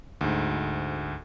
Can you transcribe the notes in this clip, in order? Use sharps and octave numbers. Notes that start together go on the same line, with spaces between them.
D2 G#2